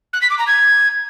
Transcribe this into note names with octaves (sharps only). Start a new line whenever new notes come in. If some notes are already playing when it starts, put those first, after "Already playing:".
F#6
B6
D6
A#5
G#6